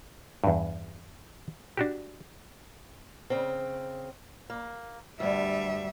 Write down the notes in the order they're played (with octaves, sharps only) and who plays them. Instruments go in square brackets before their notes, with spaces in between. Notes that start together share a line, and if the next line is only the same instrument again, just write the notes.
[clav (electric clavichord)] E2 G2
D4 F#4 G4
[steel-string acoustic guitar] C#3 C4
A#3
[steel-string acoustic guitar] D2 G2 [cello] G3 E5